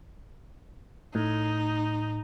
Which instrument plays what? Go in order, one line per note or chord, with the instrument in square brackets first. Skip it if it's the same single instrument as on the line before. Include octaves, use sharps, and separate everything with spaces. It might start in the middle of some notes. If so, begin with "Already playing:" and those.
[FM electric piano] A2 [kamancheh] D#4